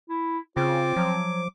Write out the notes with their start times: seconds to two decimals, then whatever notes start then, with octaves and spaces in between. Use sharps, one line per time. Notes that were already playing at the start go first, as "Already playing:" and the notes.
0.09 E4
0.57 C#3 C4 F4 D6
0.96 F3 F#3